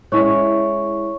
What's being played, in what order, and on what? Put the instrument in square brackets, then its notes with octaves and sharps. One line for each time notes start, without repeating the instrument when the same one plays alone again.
[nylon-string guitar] G#3 C#4 E4 [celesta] C#5 C#6